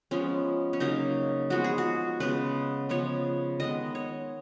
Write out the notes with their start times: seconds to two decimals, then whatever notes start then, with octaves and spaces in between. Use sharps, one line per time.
0.11 F3 G#3 B3 C#4
0.73 C#4
0.80 C#3 F#3 A#3 D#4
1.50 F3 G#3 B3 F#4
1.64 G#4
1.78 F#4
2.20 C#3 G#3 B3 B4
2.89 C#3 F3 B3 C#5
3.60 D#3 G#3 B3 D#5
3.95 C#5